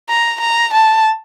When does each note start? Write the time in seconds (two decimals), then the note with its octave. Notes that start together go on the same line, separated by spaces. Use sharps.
0.09 A#5
0.40 A#5
0.73 A5